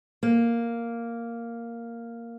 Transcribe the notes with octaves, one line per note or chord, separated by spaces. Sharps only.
A#3